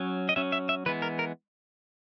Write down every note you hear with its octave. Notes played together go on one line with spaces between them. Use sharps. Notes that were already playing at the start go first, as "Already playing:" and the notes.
Already playing: F#3 C#4
D#5
F#3 C#4 E5
E5
E5
E3 G#3 B3 B4
A#4
A#4